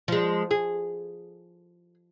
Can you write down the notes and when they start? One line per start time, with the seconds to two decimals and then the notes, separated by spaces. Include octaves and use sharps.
0.08 F3 G#3
0.51 G#4